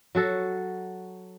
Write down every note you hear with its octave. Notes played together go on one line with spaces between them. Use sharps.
F#3 F#4 A4